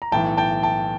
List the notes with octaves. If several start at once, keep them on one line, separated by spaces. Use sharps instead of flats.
A#5
B1 A2 E3 G5 A5
G5 A5
G5 A5